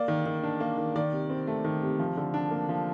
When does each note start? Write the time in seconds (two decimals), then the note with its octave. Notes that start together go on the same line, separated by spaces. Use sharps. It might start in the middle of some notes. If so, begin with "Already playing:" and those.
Already playing: A#3 D5
0.08 D#3
0.26 D#3
0.43 D4
0.60 A#3
0.78 D#3
0.96 D#3 D5
1.12 C3
1.30 C4
1.47 A3
1.64 D#3
1.82 C3
1.99 F3
2.17 D3
2.34 D4
2.51 A#3
2.69 F3